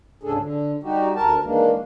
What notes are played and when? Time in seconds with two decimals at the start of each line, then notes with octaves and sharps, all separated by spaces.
0.23 D2 G#2 C#3 D4 G#4 A4
0.39 D3
0.83 G3 D#4 F#4 G4
1.16 D2 A#4 A5
1.44 D#3 E3 G#3 A#3 D4